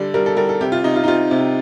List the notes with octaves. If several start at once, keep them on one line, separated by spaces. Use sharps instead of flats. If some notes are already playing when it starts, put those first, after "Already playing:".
Already playing: D3 G3 D5
G3 A#4
A4
G3 A#4
A4
C3 G4
F4
C3 D#4
F4
D#4
C3 F4
C3